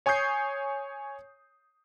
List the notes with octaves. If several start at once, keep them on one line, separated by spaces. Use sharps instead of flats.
C#5 G#5 C#6 D#6 G6 C7